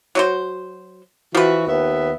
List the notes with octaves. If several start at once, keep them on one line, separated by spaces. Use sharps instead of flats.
F#3 F#4 C5
E3 F3 F#4 B4
D#2 B3 E5